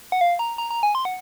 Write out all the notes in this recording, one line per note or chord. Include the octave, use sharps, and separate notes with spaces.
F#5
F5
A#5
A#5
A#5
G#5
C6
F#5